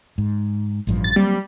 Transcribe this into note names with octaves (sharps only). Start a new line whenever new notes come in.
G#2
A1 G2 F3
A6
F#3 G3 A#3 C4